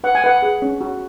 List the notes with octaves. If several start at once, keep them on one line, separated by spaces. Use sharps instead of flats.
B4 F#5
G#5
B4 F#5
G#4
C#4
F#4